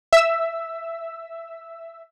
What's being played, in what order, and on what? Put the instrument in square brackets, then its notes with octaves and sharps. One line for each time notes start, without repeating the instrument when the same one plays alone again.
[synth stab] E5 E6